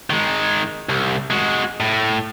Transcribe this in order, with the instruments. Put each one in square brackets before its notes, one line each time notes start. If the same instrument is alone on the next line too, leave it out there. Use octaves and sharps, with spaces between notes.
[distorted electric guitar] D#3 G#3
C2
G#3 F#4
A2